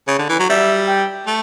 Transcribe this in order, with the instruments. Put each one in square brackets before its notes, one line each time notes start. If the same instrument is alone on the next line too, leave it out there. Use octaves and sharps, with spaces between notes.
[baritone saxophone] C#3
D3
E3
F#3
[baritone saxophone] G3 [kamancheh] E5
[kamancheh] G5
[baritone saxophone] A3